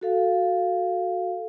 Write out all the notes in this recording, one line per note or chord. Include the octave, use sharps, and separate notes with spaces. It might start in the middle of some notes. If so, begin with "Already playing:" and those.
F#4 A4 F5